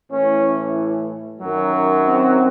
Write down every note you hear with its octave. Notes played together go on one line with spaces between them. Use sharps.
A2 E3 C#4
F#2 D#3 F#3
C4